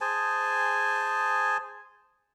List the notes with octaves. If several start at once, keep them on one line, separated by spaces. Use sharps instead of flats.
G#4 C5 G#5 A5